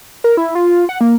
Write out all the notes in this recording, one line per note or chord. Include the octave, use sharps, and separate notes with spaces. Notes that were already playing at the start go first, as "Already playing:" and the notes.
A#4
E4
F4
F#5
A#3